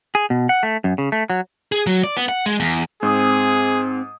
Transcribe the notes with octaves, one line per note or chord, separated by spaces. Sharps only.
G#4
B2
F#5
A3
F#2
C#3
A3
F#3
G#4
F#3
D5
B3
F#5
G#3
E2
G#2 C4 G#4 D#6